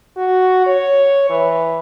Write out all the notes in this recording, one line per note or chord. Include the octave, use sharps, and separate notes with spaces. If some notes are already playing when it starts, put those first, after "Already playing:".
F#4
C#5
E3